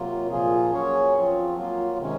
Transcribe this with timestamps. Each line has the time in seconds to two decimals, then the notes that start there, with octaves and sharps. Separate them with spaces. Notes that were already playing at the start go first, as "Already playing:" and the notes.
Already playing: C3 F#3 A#3 F4
0.29 A#2 F3 A#3 F4 G#4
0.71 F#3 A#3 C#4 G#4 C#5
1.14 F3 C4 F4
1.56 F#3 A#3 F4
1.98 C3 D#3 G#3 C#4